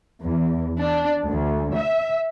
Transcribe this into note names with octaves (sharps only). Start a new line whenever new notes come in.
E2
D4
D2
E5